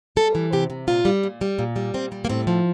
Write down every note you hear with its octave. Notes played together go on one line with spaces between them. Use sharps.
G3 A4
E3
C3 G4
C3
A#2 F4
G3
A#2
G3
A#2
G3
A#2 C4
G3
A#3
A2 C4
F3